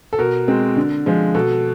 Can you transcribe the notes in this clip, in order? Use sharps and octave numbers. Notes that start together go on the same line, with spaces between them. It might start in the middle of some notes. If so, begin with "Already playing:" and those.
A4
B2 A#4
G#3 C4
D3
F3 G#3
B2 A4